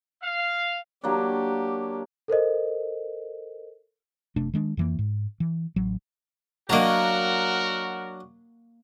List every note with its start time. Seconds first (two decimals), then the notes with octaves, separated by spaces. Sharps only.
0.22 F5
1.04 F#3 A#3 D4 G4
2.28 A4 A#4 C5 D#5
4.36 F#1 C3 A3 D4
4.54 D#3 G#3 D4
4.77 F2 E3 A#3
4.99 G#2
5.40 E3
5.76 A1 F#3
6.69 F#3 A#3 D4 F#4 A#4 D#5 A#5